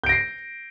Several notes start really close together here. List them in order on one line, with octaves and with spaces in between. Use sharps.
G6 D7 A#6 C7